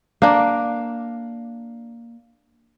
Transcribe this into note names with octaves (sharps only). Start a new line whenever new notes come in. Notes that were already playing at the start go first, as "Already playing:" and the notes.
A#3 D4